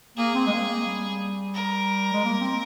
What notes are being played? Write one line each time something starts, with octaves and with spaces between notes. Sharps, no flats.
A#3 G#4
C4
G#3
A#3
A#3
G3
A#4
G#3
A#3
C4